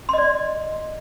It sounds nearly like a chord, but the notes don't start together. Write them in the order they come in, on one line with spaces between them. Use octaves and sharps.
C6 D#5 D5